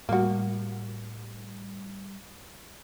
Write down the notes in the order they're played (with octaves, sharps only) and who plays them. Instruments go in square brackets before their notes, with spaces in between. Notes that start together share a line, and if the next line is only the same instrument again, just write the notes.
[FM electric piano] A2 G3 [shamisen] A#3 F#4